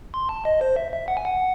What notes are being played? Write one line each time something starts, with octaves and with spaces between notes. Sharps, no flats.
C6
A5
D#5
C5
E5
E5
F#5
G#5
F#5